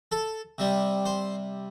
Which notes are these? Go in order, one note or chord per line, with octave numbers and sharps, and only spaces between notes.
A4
C3 G3
C5